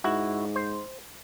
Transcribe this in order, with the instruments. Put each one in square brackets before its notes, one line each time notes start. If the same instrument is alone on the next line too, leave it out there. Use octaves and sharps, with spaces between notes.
[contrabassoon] G#2 [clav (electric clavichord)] E4 F#4
[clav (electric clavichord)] C5